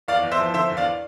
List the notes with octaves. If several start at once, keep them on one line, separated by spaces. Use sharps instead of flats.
E2 D5 F5
E2
C5 E5
F3
D3 C5 E5
E2
D5 F5